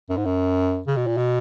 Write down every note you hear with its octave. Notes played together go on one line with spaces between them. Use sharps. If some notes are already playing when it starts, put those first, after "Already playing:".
F#2
G#2
F#2
C#3
B2
A#2
B2